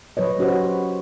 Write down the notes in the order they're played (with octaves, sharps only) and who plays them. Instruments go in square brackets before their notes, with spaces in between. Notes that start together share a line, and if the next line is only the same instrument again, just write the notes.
[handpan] F#3 B4 C#5 D#5
C#4 F#4 G4 B4 C5